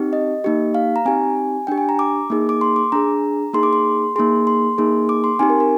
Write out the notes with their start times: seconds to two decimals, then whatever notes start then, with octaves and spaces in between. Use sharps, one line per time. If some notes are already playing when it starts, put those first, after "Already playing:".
Already playing: C4 D#4 G4
0.13 D#5
0.44 A#3 D#4 G4
0.75 F5
0.96 A#5
1.05 C4 D#4 G4 G#5
1.67 D4 G4 G5
1.78 G#5
1.89 A#5
1.99 D6
2.30 A#3 D#4 G#4
2.49 D6
2.61 C6
2.76 D6
2.92 D4 G#4 A#5
3.53 A#3 D#4 G#4 C6
3.63 D6
3.73 C6
4.16 A#3 D#4 G#4 C6
4.47 C6
4.78 A#3 D#4 G#4
5.09 D6
5.24 C6
5.39 C4 D#4 G4 G#5
5.50 A#4
5.60 A#4